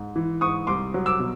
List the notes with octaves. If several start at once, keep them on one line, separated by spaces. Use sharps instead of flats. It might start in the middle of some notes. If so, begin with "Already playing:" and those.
Already playing: G#2
E3
G#2 C#6 D#6
C2 C6 D6
F#3
D6 E6
B2